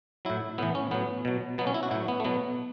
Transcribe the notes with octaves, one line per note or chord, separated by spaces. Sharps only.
A2 F#3 E4
A2 E3 B3
C#4
A2 F#3 B3
B2 F#3
B2 F#3 B3
C#4
E4
F#4
A2 F#3 E4
B3
A3
B2 F#3 B3